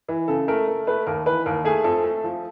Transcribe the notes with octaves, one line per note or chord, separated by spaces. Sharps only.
E3
C#3 A4
A3 A#4
A3
A3 B4
D#2 A#4
E3 B4
D#2 A#4
A3 G#4
F2 A4
A3
F3